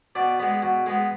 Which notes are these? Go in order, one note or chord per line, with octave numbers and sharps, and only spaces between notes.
B2 D5
G#3 B3
B2
G#3 B3